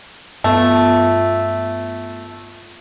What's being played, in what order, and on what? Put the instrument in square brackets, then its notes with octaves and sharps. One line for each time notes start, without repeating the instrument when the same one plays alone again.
[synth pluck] G2 B3 F4 [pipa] A3